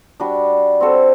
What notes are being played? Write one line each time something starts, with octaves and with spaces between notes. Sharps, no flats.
G3 D4 F#4
C4 F#4 A4 C5